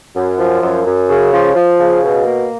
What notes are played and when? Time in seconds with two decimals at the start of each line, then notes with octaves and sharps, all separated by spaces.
0.15 F#2
0.38 F3
0.62 F#2
0.85 F#2
1.09 C#3
1.32 F3
1.55 F3
1.79 C#3
2.03 B2
2.26 A#3